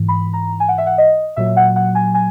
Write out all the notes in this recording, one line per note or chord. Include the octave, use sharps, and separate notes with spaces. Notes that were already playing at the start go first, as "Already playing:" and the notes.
Already playing: G#2 E3
B5
A#5
G#5
F#5
E5
F#5
D#5
A#2 F#3 E5
F#5
F#5
G#5
G#5